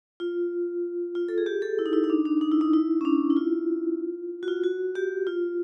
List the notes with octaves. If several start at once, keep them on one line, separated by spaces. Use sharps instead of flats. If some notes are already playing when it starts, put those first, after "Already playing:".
F4
F4
A4
G#4
G4
A4
E4
D#4
E4
D#4
D4
D4
D#4
E4
D#4
E4
C#4
D4
E4
F4
F#4
F4
F#4
G4
F4